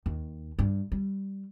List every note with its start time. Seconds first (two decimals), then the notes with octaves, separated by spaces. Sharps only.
0.06 D#2
0.59 G2
0.92 G3